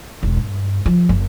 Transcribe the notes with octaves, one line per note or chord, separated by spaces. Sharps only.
E1
G2
F3
F#1